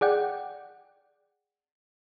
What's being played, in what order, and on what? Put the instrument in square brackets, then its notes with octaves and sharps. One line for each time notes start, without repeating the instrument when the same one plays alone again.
[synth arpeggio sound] G#4 D5 F#5 G5